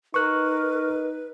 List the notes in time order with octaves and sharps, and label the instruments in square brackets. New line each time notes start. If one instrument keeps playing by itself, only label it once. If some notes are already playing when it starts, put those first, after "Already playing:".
[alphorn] D#4 [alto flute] A#4 [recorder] B4 [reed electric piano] C#6 F#6